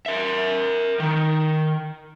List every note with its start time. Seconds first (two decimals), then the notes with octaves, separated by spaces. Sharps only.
0.06 A#4 E5
1.00 D#3